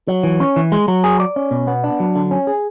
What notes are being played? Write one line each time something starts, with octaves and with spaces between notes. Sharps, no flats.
F#3
E3
C#4
E3
G#3
F#3
G#4
D5
C#4
B2
B3
D4
F#3
D3
C#4
G#4